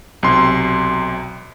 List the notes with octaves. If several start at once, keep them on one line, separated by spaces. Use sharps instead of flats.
B1 C3 C6